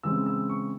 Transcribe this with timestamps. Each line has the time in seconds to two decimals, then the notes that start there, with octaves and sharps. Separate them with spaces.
0.03 C#3 E3 G#3 C4 E6
0.26 E6
0.49 C#6